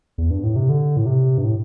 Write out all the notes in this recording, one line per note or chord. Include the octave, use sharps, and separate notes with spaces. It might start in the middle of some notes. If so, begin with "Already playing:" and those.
E2
G2
A2
C3
D3
A2
C3
G2
A2